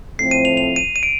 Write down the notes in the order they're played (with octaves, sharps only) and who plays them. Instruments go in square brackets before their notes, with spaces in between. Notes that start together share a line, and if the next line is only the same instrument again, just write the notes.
[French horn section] A2 F3 A3 C4 [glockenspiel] C7
[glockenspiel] D#7
F7
F7
D#7
D#7
D7